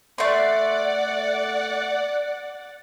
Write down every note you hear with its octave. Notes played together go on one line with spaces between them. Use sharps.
A3 D5 F#5 C6